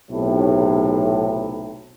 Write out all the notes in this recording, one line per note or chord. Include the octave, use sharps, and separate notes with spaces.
B1 A2 C3